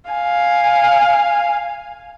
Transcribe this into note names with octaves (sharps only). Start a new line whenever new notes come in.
F5 G#5